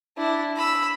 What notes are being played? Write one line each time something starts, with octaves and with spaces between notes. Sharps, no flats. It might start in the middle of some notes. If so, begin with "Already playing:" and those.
D4 E4
B5 E6